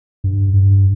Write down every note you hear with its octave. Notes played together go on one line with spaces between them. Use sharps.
G2
G2